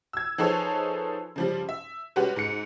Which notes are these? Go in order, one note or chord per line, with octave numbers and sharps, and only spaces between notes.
E6 G#6
F3 D#4 G#4 A4 B4 C#5
C#3 F3 G3
E5
G3 G#3 C#4 F#4 G4 B4
G#2 C#7